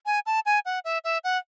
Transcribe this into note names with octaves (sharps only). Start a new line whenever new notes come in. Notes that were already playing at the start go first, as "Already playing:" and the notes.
G#5
A5
G#5
F#5
E5
E5
F#5